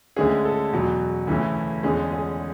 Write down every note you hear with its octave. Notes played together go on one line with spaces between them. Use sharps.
D2 D3 G#3 C#4 G#4
A4
E2 B2 F#3
D2 C#3 E3 A3 C#4
E2 D3 G#3 C#4 G#4
G#4